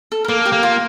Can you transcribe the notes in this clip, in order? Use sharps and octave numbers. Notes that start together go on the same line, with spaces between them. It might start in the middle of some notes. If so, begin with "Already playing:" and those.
A4
A#4
A#3 A4
G4
A#3
F4